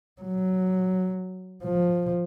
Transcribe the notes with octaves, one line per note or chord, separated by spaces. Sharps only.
F#3
F3